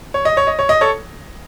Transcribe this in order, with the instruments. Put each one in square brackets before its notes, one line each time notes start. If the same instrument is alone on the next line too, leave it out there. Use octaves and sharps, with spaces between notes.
[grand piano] C#5
D#5
C#5
D#5
C#5
D#5
A4 C#5